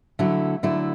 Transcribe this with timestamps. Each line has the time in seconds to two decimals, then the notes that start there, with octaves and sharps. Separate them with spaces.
0.19 D3 F#3 A3 E4
0.63 D3 F#3 A3 E4